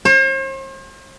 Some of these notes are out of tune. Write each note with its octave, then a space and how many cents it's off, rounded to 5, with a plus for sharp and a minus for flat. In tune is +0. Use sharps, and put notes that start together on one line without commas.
C5 +45